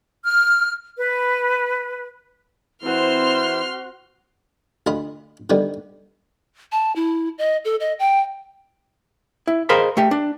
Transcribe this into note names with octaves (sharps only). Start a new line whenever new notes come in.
F6
B4
E3 C4 E4 F#4 C5 C6 F6
D2 F4 D#5 B5
D3 D#3 G3 B3
A5
E4
D#5
A4
D#5
G5
E4
G#4 A#4 C5 D#5 F5 B5
A3 G4
D4